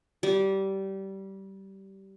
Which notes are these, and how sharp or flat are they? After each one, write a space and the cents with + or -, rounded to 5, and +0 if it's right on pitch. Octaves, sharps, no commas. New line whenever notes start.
G3 -20